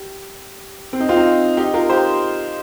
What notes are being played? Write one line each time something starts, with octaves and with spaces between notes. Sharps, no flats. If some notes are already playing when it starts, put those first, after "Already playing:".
Already playing: G4
C4
D#4
C4 F4
D#4
D#4 G4
F4 A#4
G4 C5